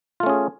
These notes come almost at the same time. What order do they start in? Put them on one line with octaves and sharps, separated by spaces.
F4 A3 C#4 G#4